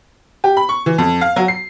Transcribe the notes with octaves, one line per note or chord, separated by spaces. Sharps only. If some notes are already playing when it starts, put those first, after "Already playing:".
G4
B5
C#6
E3
F2
F5
F#3
C7